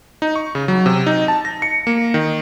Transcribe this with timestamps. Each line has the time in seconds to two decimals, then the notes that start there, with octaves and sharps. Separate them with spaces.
0.22 D#4
0.36 C#6
0.55 C#3
0.68 F#3
0.86 C3
1.07 D#4
1.28 A5
1.45 A#6
1.62 C#7
1.87 A#3
2.14 D#3